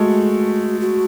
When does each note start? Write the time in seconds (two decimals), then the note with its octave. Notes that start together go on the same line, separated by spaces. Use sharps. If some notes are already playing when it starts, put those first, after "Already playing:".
Already playing: G#3 A3 F#4
0.81 F#4